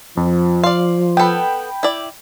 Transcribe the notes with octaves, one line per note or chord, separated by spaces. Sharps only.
F2 F3
D5 F5 C6
B3 A4 G5 B5
E4 D5